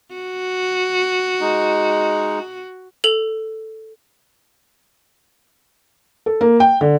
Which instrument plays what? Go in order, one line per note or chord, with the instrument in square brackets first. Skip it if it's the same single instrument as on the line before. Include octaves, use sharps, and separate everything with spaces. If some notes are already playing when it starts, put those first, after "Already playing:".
[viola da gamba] F#4
[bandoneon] G#3 D#4
[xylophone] A4 F7 F#7
[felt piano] A4
A#3
G5
D3